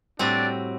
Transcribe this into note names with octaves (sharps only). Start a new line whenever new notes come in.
A2 G3 C4 D4 F#4